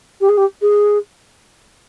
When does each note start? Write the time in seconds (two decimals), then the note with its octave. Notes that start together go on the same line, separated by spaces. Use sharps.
0.20 G4
0.29 G#4
0.37 G4
0.61 G#4